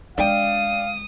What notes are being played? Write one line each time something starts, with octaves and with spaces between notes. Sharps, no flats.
G#3 D4 F5 G5 D#6